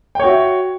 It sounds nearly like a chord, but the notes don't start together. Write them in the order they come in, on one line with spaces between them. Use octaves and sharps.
G5 C#5 F#4 E5